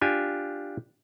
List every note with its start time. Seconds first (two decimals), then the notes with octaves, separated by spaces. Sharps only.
0.01 D4 F4 G4 G#5